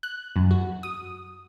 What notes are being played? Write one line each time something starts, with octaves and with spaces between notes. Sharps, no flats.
F#6
F#2
F#4
D#6